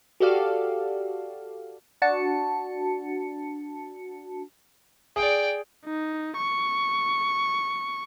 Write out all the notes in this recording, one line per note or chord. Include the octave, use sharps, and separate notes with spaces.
F#4 G4 A4 D5 F5
D4 F#4 A5 C#7
G#4 D5 G5
D#4
C#6